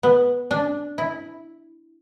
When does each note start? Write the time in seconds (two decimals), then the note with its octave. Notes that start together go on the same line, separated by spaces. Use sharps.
0.03 B3
0.51 D4
0.98 E4